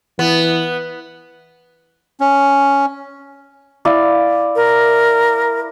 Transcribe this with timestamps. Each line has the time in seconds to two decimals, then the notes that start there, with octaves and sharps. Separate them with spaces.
0.19 E3 B3
2.20 C#4
3.85 E4 D5 F5
4.56 A#4